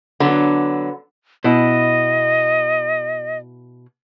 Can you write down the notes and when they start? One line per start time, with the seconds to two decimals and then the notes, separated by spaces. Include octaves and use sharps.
0.20 D3 F#3 B3
1.44 B2 E4 D#5